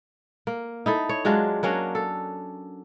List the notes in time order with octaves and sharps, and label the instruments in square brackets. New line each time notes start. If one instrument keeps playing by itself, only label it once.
[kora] A#3
D#4 E4 A4
C#5
F#3 G#3 D4 F4
F#3 A#3 C#4 D4
A4